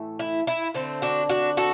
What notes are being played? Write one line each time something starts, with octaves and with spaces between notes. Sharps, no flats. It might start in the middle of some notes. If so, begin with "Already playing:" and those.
Already playing: A2 E3 A3
E4
E4
D3 A3 C4
D4 F#4
D4 F#4
F#4 A4